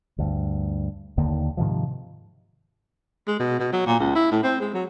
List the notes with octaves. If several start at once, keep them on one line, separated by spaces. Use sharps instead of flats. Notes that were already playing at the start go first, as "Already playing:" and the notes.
D2 G2
D#2 D3 D#3 A#3
G#2 C3 D#3 F3
G#3
B2
B2
F#3
A#2
C#2
E4
A2
C4
G#3
F#3